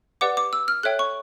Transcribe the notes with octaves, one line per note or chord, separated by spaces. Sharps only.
G4 B4 D5 F#5 D6
D6
E6
F6
A4 C#5 E5 G5 F#6
C#6